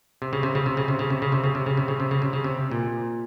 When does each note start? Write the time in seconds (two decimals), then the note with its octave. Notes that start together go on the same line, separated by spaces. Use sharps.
0.22 C3
0.33 C#3
0.43 C3
0.55 C#3
0.66 C3
0.77 C#3
0.88 C3
0.99 C#3
1.10 C3
1.22 C#3
1.32 C3
1.44 C#3
1.55 C3
1.66 C#3
1.77 C3
1.88 C#3
2.00 C3
2.11 C#3
2.22 C3
2.33 C#3
2.44 C3
2.71 A#2